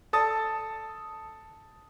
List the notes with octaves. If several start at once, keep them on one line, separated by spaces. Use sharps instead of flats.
A4 A5 D#6 A6